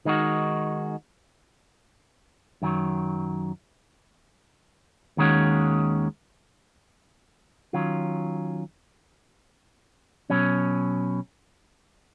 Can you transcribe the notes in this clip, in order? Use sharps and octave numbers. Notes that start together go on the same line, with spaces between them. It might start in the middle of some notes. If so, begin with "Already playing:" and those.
D#3 G#3 D#4 F#4
F#2 D#3 F#3
D#2 D#3 G#3 C#4 F#4
D#3 F#3 C#4 F4
B2 F#3 C#4